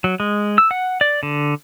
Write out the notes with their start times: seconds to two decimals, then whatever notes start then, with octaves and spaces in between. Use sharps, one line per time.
0.04 F#3
0.20 G#3
0.58 E6
0.71 F#5
1.01 D5
1.23 D3